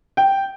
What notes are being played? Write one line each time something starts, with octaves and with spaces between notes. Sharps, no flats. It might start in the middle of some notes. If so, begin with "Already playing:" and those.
G5